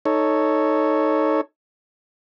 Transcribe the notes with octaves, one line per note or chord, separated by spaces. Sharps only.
D#4 A4 C#5